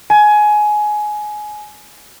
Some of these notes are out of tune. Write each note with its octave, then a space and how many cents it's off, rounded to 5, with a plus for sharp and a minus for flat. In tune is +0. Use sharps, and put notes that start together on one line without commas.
G#5 +20